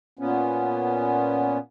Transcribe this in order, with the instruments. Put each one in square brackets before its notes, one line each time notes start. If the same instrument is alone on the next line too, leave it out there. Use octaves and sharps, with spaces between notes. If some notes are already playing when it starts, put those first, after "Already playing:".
[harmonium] A#2 B3 C#4